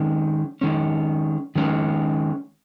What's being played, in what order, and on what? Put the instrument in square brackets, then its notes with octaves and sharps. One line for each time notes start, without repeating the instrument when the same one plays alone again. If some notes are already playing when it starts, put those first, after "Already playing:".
Already playing: [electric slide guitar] D#3 G#3 C#4
D#3 G#3 C#4
D#3 G#3 C#4